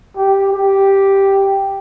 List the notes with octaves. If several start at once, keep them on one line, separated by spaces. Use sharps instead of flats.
G4
G4